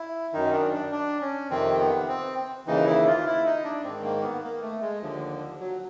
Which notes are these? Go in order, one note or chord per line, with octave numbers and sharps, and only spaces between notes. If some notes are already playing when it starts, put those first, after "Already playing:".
Already playing: E4
F#2 D#3 D#4
D4
D4
D4
C#4
F2 C3 D#3 C4
B3
C4
D#2 C#3 E3 D#4
E4
F4
E4
D#4
D4
G#2 D#3 C4
A#3
B3
A#3
A3
G#3
D#2 D3 F3
F#3